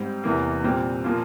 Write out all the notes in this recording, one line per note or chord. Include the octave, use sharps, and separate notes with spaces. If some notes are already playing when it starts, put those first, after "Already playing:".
Already playing: G#2 G3 C4
E2 C3 E3 A#3
A#2 G3 C4
A#2 F3 A#3 F4